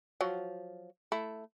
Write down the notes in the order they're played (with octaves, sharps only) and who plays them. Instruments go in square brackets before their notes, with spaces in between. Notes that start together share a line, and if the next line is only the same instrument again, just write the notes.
[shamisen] F3 F#3
A3 E4